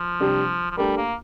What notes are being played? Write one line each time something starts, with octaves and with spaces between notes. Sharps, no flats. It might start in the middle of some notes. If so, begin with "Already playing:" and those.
Already playing: F3
C3 G3 D4 G4
F3
G3 A3 D4 G4 A#4
A#3